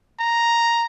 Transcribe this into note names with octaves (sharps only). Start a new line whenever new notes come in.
A#5